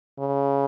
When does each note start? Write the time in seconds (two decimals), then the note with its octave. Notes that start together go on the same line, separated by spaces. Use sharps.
0.19 C#3